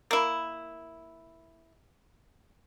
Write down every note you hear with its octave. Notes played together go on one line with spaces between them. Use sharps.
A#3 E4